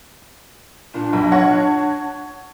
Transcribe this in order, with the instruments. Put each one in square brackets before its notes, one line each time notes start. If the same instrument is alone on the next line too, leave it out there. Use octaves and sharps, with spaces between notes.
[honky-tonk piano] A#2 [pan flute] D4
[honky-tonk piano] B1
C#5 F#5 A#6